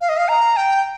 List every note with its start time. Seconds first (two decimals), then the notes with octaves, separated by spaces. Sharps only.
0.01 F5
0.09 D#5
0.17 F5
0.29 A#5
0.57 G5